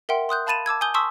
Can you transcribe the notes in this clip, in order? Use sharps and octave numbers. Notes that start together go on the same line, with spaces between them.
A#4 E5 F#5 G5 C6
C6 D#6 F#6 G6
F5 A5 B5 A6 D#7 E7
A5 D6 E6 G#6
G#5 D#6 G6 G7
A5 C6 C#6 D#6 E6 B6